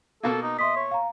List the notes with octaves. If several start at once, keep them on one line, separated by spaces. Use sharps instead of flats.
B2 A#3 A4
D#4
D#5 E5 C6 B6
C#5
F5 A#5